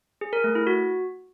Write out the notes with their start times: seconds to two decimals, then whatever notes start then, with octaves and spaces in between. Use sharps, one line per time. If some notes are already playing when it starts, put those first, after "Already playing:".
0.21 G#4
0.33 A#4
0.44 A3
0.55 E4
0.67 F#4